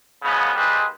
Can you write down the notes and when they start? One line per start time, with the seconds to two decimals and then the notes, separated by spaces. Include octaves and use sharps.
0.23 F#2 C#3 F3 G#3 B3
0.55 D#2 G3 G#3 G#4 B4 C5